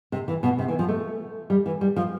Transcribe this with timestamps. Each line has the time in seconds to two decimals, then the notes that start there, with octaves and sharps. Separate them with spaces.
0.12 C3
0.28 E3
0.43 B2
0.59 C3
0.68 E3
0.79 F3
0.88 A3
1.50 G3
1.66 E3
1.81 G3
1.96 F3